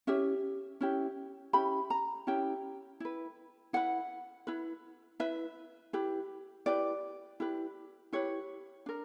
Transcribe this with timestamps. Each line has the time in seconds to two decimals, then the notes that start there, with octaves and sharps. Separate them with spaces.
0.07 C#4 E4 G4 E5
0.81 C#4 E4 G4
1.53 C#4 E4 G4 B5
1.90 A#5
2.27 C#4 E4 G4 G5
3.00 E4 B4
3.73 E4 B4 F#5
4.47 E4 B4
5.20 E4 B4 E5
5.93 E4 G4 B4
6.66 E4 G4 B4 D5
7.40 E4 G4 B4
8.13 E4 G4 B4 C#5
8.86 D4 A#4